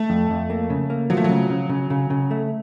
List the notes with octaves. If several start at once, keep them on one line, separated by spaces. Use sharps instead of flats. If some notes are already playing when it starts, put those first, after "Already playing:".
Already playing: A3
F2
F2
A#3
C#3
A#3
F3 F#3
A3
F#3
C#3
C#3
C#3
C#3
C#3
A3